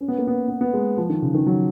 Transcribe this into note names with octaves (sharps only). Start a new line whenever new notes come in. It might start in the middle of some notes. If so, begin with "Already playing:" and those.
C#4
B3
A#3
B3
B3
B3
G#3
F3
D#3
C#3
D#3
F#3